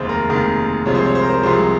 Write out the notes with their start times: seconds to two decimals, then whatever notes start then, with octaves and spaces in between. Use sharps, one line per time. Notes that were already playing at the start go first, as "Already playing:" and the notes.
Already playing: F1 D#2 D#3 G#3 C5
0.09 A#4
0.29 F1 D#2 D#3 G#3
0.85 C2 C3 F3 G#3 C#5
0.95 C5
1.05 C#5
1.15 C5
1.22 A#4
1.30 C5
1.43 C2 C3 F3 G#3 C5